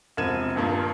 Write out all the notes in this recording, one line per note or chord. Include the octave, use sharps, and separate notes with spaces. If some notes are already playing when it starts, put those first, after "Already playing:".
E1 C2 F3 G#6 D#7 E7
D#1 G2 A#3 F4